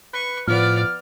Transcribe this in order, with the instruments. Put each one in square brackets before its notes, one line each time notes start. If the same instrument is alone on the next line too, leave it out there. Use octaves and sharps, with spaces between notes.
[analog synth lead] B4 [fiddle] C#6
[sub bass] A2 [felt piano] F3 [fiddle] B3 D5 [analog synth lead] F6